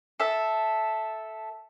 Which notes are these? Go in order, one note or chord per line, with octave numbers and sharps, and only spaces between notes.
A4 E5